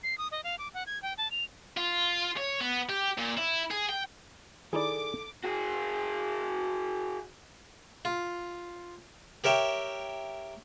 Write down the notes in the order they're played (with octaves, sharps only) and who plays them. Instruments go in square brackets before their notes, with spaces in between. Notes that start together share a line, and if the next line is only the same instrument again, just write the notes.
[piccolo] C7
D#6
D#5
F5
D6
F#5
G#6
G5
A5
F7
[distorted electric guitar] F4
C#5
B3
G4
A#2
E4
G#4
G5
[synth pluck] D#3 D#4 E4 [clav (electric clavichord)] G#4 D5 [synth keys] A4 [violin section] D6
[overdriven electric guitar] F#4 G#4
[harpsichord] F4
G4 A#4 C#5 E5 G5